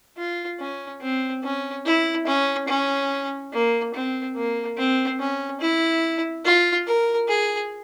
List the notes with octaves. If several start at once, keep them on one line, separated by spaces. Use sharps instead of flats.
F4
C#4
C4
C#4
E4
C#4
C#4
A#3
C4
A#3
C4
C#4
E4
F4
A#4
G#4